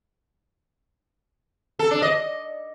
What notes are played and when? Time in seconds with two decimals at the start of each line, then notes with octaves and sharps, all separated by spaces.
1.79 A4
1.91 D4
2.02 D#5